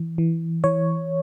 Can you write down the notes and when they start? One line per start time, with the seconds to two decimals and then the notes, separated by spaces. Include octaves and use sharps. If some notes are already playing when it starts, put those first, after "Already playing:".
Already playing: E3
0.18 E3
0.64 E3 C#5